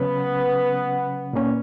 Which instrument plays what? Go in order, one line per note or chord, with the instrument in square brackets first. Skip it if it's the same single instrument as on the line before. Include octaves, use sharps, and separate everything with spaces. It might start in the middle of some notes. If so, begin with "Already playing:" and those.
Already playing: [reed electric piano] C#3 F#3 C#4 [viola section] B3
[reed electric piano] A#2 A#3 C#4